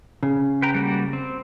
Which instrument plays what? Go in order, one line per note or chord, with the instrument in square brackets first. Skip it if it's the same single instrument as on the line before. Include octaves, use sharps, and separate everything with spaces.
[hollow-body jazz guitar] C#3
[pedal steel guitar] B4 G5 A#5
G3 A#3 F#4
C4